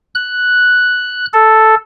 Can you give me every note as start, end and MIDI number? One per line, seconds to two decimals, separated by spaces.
0.15 1.26 90
1.33 1.75 69